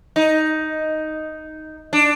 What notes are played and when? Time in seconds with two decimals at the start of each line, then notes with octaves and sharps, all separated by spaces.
0.16 D#4
1.93 D4